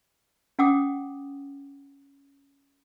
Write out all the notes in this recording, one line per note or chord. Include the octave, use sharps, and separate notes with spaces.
C#4 F#5 G5 D6 D#6